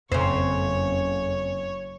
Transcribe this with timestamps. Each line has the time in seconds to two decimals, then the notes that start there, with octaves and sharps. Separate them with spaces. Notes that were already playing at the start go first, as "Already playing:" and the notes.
0.12 F#1 F2 C#3 C5 C#5